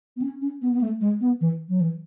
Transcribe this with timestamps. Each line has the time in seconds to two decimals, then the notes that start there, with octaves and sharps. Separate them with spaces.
0.16 B3
0.22 C#4
0.42 C#4
0.62 B3
0.73 B3
0.81 A3
1.01 G#3
1.21 B3
1.41 E3
1.69 F#3
1.81 E3